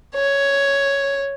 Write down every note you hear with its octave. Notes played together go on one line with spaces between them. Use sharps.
C#5